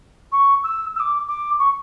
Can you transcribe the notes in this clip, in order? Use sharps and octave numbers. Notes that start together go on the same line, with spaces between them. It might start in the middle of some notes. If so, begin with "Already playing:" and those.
C#6
E6
E6
D6
D6
C#6